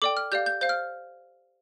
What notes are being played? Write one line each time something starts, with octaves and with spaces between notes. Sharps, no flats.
A4 D5 G5 D6
F6
G4 D5 F5 G6
G6
C5 F5 G6
F6